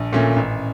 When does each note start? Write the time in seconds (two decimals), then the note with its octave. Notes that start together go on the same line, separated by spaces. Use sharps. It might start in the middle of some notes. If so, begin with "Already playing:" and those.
Already playing: A#1
0.13 A#2 A3 C#4
0.36 A1